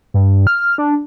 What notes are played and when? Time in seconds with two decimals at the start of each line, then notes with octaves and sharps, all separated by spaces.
0.14 G2
0.47 F6
0.78 D4